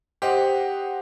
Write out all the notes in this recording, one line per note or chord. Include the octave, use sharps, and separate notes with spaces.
G4 C5 D#5 F#5